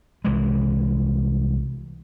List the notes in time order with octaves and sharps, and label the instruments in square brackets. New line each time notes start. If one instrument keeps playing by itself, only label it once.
[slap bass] C2 E3 G#3